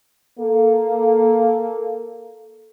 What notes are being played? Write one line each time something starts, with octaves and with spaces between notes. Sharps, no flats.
A#3 A4